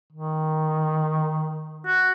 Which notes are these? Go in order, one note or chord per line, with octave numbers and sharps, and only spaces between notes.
D#3
F#4